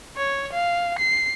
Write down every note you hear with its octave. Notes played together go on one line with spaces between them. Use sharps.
C#5
F5
C7